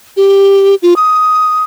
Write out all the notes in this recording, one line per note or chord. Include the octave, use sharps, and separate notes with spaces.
G4
F4
D#6